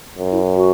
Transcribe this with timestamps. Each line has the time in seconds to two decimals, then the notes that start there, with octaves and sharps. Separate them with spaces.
0.18 F#2
0.32 E4
0.57 F#4